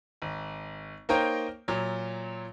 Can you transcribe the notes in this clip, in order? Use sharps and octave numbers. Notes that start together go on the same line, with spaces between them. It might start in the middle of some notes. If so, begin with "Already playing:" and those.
G#1
A#3 D#4 A#4 C5 C#5 G5
A#2 F#3